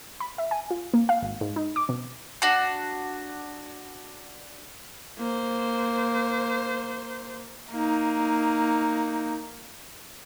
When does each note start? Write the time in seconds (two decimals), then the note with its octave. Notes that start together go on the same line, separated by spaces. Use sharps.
0.20 B5
0.38 E5
0.51 G#5
0.71 F4
0.94 A#3
1.09 F5
1.22 G#1
1.41 G#2
1.56 D#4
1.76 D6
1.89 B2
2.42 D4 F#4
5.18 A#3 C5
7.71 A#3 D#4